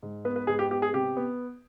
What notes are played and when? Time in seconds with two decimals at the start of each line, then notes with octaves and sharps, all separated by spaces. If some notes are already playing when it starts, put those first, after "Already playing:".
0.03 G#2
0.25 B3 B4
0.36 B4
0.47 G#2 G#4
0.59 G4
0.70 B3 G4
0.82 G#4
0.93 C3 G4
1.17 B3